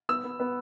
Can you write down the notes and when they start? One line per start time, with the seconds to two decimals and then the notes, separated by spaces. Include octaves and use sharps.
0.09 B3 E6
0.24 B3
0.40 B3